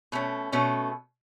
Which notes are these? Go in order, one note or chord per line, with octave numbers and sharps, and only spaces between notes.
B2 A3 C#4
B2 A3 C#4